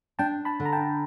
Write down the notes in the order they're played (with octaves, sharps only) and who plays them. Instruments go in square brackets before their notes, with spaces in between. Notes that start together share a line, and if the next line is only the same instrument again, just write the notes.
[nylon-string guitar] D4 [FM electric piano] G5 A5
[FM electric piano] A5 B5
[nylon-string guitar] D3
[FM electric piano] A#5
G5 A5